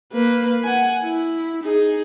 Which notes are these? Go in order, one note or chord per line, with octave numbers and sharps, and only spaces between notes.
A#3 B4
F#5 G#5
E4
D#4 G#4